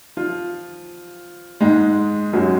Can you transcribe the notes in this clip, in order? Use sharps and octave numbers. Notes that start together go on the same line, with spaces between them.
F3 F4
G#2 G#3
F#2 F#3